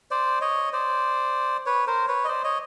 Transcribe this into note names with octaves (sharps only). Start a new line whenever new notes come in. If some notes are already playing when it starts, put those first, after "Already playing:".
C5 D5
C#5 D#5
C5 D5
B4 C#5
A#4 C5
B4 C#5
D#5
C5 D5
C#5 D#5